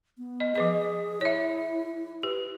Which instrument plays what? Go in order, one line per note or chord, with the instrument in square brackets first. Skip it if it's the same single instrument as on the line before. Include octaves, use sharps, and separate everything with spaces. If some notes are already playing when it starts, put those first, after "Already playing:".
[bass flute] B3
[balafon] D#5
[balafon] F3 B4 D#5 [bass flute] G#4
[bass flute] E4 [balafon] C#5 E5
[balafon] G4 [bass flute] B4